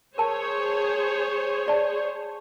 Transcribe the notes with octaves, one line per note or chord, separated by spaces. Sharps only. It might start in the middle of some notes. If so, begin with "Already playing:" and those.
G#4 A#4 C5 C#5 A5
G4 D5 A5